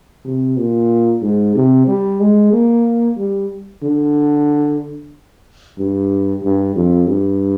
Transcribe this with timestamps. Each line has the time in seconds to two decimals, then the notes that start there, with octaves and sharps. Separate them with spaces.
0.25 C3
0.57 A#2
1.22 G#2
1.55 C3
1.87 G3
2.20 G#3
2.53 A#3
3.18 G3
3.83 D3
5.78 G2
6.43 G2
6.76 F2
7.08 G2